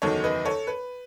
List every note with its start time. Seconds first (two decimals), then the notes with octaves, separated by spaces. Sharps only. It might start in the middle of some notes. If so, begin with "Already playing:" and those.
0.02 F#1 E2 D#3 F#3 A4 C#5
0.24 B4 D#5
0.45 A4 C#5
0.67 B4